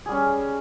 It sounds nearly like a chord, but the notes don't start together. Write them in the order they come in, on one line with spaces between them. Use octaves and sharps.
G#4 G3 C#4